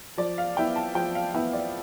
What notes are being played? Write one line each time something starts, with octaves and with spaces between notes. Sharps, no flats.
F3 D5
F5
B3 E4 G5
A5
F3 G5
F5
B3 E4 G5
D5